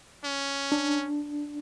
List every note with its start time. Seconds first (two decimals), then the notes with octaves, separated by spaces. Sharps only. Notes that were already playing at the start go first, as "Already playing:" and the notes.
0.25 C#4
0.72 D4